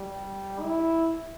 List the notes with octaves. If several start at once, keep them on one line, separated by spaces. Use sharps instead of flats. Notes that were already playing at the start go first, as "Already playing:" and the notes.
Already playing: G3
E4